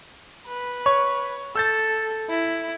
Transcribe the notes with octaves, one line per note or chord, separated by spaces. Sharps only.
B4
C#5 C#6
A4 E6 G6 A6
E4